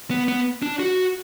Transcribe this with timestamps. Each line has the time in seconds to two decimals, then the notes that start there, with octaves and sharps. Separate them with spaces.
0.11 B3
0.28 B3
0.63 D4
0.80 F#4